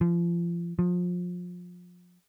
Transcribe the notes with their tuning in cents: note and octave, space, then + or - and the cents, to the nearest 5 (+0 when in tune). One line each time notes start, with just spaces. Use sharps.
F3 -30
F3 +25